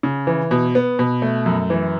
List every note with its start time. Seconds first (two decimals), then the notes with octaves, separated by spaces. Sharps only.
0.03 C#3
0.27 E3
0.51 B2
0.75 B3
0.99 B2
1.22 A3
1.46 F#2
1.70 E3